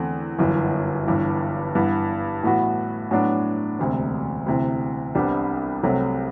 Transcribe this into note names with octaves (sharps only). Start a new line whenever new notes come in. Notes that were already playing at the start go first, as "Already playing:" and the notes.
Already playing: E2 D3 A3 C4
G1 F#2 E3
G1 G2 E3
G2 E3 B3
A2 E3 B3 F#4
A2 F#3 B3 D4
E1 D2 C3
D2 C3 E3
C2 C3 G3 B3 D4
C2 C3 F#3 A3